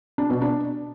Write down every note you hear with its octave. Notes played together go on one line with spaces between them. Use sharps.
D4
B2
D4